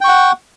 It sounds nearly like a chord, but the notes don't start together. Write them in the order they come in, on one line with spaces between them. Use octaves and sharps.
G5 C#6 F#5